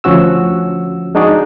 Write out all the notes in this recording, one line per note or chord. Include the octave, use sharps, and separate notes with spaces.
D2 F3 C#4 F#4 E6
G#3 D4 D#4 F#4 G#4 D5